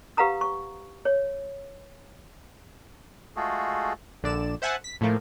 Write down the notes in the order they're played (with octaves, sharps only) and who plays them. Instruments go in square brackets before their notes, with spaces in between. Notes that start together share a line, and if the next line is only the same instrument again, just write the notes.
[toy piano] G4 B4 F5 F#5 A#5 D#6
C#6
C#5
[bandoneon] G#3 A3 F4 F#4 G#4 A4
[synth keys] A#1 D3 D5 E7
C5 E5 F#5 G#5 A5
B6
A2 F3 A3 A#3